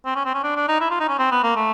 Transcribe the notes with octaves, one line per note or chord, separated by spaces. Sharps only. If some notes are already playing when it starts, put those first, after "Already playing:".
C4
C#4
C4
C#4
D4
D4
D#4
E4
F4
D#4
C#4
C4
B3
A#3
A3